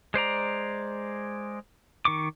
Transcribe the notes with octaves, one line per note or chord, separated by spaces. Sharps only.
G#3 C5 D5 A#5
D#3 C#6 D6